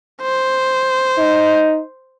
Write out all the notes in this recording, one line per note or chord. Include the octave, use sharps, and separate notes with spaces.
C5
D#4